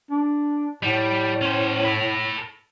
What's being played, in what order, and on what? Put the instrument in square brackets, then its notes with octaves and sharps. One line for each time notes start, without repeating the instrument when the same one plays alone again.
[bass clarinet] D4
[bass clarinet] A2 [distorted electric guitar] G3
[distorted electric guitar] C#4 C5
A4 B5